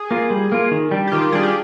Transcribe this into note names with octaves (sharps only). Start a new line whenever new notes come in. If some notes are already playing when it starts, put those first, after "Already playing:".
Already playing: G#4
A#3 F4
G3
A#3 F4
D#3
G3 D4
G4
D#3 F4
G4
G3 D4 G#4
G4